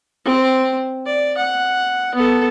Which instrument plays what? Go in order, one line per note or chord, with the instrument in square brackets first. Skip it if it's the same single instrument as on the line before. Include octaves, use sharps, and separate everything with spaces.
[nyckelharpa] C4
D5
F#5
B3 A4